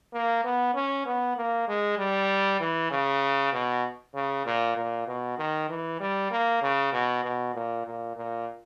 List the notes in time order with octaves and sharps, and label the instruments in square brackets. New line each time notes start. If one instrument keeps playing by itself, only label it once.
[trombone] A#3
B3
C#4
B3
A#3
G#3
G3
E3
C#3
B2
C#3
A#2
A#2
B2
D#3
E3
G3
A#3
C#3
B2
B2
A#2
A#2
A#2